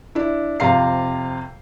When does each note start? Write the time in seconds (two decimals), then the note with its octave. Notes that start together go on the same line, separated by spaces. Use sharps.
0.15 D4 E4
0.60 F2 C3 F4 F5 A#5 C7